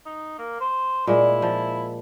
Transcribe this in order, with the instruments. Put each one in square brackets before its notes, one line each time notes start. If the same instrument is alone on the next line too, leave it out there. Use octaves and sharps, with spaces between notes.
[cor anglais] D#4
A#3
C5
[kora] A#2 G#3 [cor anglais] E4
[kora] F3